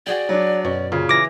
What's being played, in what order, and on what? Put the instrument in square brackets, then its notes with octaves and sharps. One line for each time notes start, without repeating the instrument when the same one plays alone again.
[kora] F#4 G#4 G5 [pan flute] D5
[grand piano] F#3 D4
[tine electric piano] F#2 [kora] B2 [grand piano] C#4
[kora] A#2 [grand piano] C#3
[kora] E3 [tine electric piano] D6 A#6